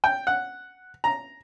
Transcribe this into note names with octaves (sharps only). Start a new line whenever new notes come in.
G5
F#5
A#5